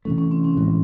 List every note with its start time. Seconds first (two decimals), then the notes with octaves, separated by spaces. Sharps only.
0.05 C3 E3 A3 C#4
0.18 C#4
0.31 C4
0.44 C#4
0.57 A2 E3 G#3